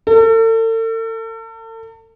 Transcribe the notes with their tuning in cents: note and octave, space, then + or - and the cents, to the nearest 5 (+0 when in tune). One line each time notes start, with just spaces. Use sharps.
A4 +40